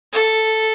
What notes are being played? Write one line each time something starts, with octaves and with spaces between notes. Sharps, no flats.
A4